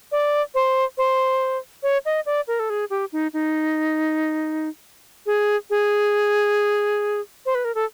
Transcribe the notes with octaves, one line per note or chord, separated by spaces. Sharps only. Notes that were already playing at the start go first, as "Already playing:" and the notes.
D5
C5
C5
C#5
D#5
D5
A#4
A4
G#4
G4
D#4
D#4
G#4
G#4
C5
B4
A#4
A4